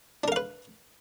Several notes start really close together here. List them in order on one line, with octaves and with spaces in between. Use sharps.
D4 A#4 F5 B4